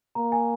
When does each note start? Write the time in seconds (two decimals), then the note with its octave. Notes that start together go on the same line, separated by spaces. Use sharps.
0.15 A#3 A#5
0.32 G#5